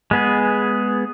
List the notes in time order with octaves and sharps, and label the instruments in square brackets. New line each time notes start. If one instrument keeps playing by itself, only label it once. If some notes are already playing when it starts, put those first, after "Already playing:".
[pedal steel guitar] G#3 B3 G#4